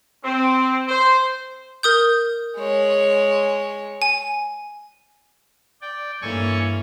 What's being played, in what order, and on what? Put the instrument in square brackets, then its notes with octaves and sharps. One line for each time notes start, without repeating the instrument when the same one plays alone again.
[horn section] C4
C5
[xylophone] A#4 D#6 G6
[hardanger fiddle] G#3 C#5
[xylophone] G#5
[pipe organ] D5 G5
[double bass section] G2 [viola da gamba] E3 A#3 C#4 [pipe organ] A4 G#5 C#6